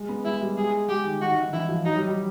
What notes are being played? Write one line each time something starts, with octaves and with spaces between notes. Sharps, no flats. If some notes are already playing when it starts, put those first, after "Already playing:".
Already playing: G#3
B3
G#3 E4
G3
G#3 G#4
G#3 G4
D#3
D#3 F#4
D#3
D#3
E3 E4
F3
F#3 D#4
G3
G3